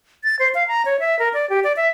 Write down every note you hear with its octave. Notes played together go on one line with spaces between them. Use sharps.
A6
C5
F5
A#5
C#5
E5
A#4
D5
G4
D5
E5